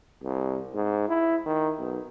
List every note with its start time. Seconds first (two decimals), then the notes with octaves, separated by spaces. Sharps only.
0.23 C2
0.74 G#2
1.08 E4
1.46 D#3
1.79 B1